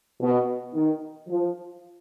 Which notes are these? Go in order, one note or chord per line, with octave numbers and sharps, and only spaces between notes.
B2
D#3
F3